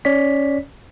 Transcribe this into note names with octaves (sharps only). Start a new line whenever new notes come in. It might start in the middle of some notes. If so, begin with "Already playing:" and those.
C#4 C#5 D5 B6